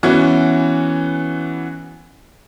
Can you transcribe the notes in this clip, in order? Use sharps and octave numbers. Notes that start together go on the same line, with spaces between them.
E3 B3 C#4 F#4